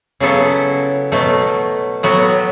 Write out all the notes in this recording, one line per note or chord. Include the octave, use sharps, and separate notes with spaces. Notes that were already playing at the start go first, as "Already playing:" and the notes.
C#3 F#3 B3 E4 A4
B2 F#3 A3
A2 F#3 B3 F#4